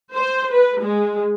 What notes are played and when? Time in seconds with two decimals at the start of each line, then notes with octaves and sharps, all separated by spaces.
0.15 C5
0.53 B4
0.81 G#3